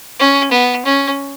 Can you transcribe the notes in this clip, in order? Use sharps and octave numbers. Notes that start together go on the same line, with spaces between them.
C#4
B3
C#4